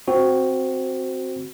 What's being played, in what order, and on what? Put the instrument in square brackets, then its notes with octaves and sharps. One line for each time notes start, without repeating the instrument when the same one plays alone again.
[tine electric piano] C4 F#4